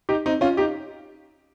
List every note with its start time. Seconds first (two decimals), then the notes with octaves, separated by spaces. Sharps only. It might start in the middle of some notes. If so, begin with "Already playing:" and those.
0.09 D#4 G4
0.26 C4 D#4
0.41 C#4 F4
0.57 D#4 G4